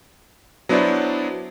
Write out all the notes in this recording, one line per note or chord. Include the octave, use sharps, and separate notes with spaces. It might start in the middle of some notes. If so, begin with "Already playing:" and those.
F#3 B3 D4 E4 C5 D5